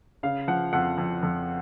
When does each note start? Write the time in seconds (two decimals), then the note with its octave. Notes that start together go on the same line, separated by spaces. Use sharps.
0.23 C#3 F5
0.48 F3 F#5
0.73 F2 F#5
0.98 F2
1.23 F2